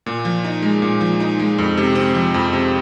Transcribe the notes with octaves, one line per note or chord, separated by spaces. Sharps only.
A#2
F3
D#4
G#3
A#2
F3
D#4
G#3
F2
C3
C4
F3
F2
C3